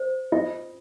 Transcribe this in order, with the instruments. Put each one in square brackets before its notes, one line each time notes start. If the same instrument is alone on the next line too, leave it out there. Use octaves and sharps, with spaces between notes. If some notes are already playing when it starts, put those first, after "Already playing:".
Already playing: [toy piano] C5
[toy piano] F4 [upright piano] D#5